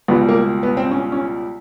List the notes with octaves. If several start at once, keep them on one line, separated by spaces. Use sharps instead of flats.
C#2 B2 G3 B3
A#3
B3
C4
C#4
C#4